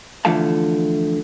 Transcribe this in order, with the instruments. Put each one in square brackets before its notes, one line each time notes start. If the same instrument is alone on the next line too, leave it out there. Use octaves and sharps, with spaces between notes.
[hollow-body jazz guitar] D3 E3 F3 A3 F5 A5